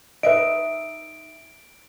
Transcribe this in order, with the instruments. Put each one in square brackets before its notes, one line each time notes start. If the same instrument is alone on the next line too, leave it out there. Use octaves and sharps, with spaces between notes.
[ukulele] D#4 E5 [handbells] B4 D#5 [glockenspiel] D7